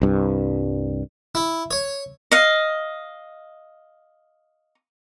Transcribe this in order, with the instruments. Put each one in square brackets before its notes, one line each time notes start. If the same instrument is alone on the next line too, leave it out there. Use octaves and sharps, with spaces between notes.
[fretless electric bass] C2 G2
[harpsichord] E4
C#5
[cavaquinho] D#5 F5